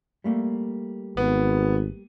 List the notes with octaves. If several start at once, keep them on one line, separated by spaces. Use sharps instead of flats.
G3 A3 A#3
G#1 B3